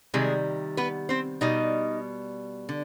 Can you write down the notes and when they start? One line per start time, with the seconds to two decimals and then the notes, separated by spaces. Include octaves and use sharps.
0.14 C3 D#3 G3 G#3 G#4
0.77 B3 B4
1.09 C4 C5
1.41 B2 G3 D#4 D#5
2.69 D3